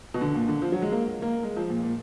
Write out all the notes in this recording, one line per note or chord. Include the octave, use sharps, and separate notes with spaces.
B2
D3
A#2
D3
F3
F#3
G#3
A#3
A#3
G#3
F3
A#2
A#2